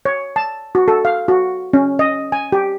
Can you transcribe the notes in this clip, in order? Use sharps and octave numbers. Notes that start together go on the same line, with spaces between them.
C#5
A5
F#4
A4
F5
F#4
C#4
D#5
G#5
G4